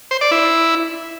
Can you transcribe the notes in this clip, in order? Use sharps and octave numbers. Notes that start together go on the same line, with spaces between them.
C5
D5
E4